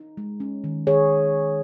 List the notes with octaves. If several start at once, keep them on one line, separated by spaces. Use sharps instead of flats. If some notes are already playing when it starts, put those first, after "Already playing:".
Already playing: D#4
G#3
C#4
D#3
D#3 G#4 C#5